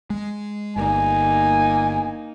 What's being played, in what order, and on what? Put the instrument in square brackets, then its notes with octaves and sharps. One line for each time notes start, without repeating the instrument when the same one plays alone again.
[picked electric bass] G#3
[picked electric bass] G1 [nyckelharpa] A#3 D#4 [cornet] G#5